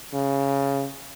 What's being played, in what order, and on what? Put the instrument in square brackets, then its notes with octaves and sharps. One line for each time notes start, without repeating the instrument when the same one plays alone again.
[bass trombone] C#3